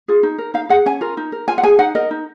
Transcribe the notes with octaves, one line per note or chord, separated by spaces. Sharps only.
F4 G#4
D#4
A#4
D#4 F5
G#4 F#5
C#4 G#5
F4 A#4
D#4
A#4
F4 G#5
F#5
G#4 G#5
D#4 F#5
A#4 D#5
D#4